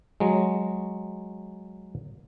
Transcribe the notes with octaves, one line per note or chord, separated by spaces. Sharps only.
F#3 G#3